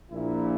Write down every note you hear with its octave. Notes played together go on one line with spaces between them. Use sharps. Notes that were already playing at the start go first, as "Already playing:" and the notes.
A#1 A#2 E4